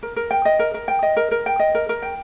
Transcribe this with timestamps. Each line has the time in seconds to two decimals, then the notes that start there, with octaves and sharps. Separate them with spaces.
0.03 A#4
0.16 A#4
0.31 G5
0.45 D#5
0.59 A#4
0.74 A#4
0.88 G5
1.03 D#5
1.17 A#4
1.31 A#4
1.46 G5
1.59 D#5
1.75 A#4
1.89 A#4
2.02 G5